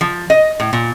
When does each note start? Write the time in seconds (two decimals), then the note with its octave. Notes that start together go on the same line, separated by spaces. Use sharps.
0.01 F3
0.30 D#5
0.60 A2
0.73 A#2